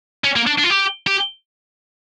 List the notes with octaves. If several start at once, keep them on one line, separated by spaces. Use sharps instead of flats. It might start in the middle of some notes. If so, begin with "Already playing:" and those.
C#4
A#3
D4
D4
F4
G4
G4